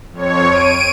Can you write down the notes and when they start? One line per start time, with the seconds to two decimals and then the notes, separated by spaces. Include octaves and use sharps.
0.12 F2 C#5
0.47 D7 D#7